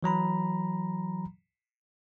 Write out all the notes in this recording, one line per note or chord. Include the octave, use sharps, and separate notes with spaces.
E3 F#3 A#5 B5